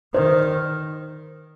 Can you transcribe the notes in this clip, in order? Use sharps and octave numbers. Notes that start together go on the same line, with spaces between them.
D#3 C5